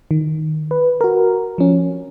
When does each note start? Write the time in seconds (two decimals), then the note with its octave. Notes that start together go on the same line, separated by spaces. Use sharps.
0.11 D#3
0.71 B4
1.01 F#4 A#4
1.58 F3 C#4